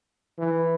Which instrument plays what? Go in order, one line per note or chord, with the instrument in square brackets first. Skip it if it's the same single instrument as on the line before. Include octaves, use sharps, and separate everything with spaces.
[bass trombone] E3